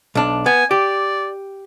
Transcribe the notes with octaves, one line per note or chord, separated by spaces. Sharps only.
B1 D4
B3 G#5
G4 D5